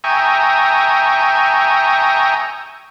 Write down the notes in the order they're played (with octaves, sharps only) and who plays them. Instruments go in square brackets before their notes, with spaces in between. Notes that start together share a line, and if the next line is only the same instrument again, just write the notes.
[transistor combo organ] E5 G5 G#5 A#5 C#6 D#6